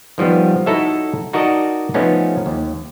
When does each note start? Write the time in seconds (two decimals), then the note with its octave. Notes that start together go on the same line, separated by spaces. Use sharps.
0.18 D#3 F3 G3 B3
0.66 D#4 E4 F#4 A4 C#5 E5
1.33 D#4 F#4 A#4 D5 D#5 A5
1.94 F3 A3 B3 C#4 D#4
2.46 D#2